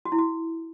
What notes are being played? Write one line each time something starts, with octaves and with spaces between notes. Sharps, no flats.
F#4
E4
F#4